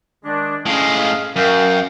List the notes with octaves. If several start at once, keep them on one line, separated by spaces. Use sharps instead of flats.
D#3 G#3 D4
A2 G#3 C#4 G#4 F5
F#2 A#4 F5 G5